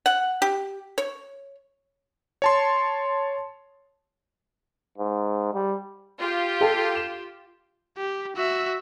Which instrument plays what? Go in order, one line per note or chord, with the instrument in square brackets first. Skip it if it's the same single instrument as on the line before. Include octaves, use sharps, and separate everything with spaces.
[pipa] F#5
G4
C#5
[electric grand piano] C#5 A5 C6
[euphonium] G#2
G3
[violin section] F4 G4
[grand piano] A4 G5 A5
E7
[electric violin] G4
F#4 E5